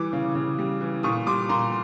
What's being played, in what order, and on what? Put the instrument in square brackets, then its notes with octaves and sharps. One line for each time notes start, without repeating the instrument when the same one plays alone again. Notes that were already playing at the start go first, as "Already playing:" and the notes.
Already playing: [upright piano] E3 G3 D6
C#3
C#3
G3
E3
A#2 C#6 D#6
G3 C6 D6
A#2 A#5 C6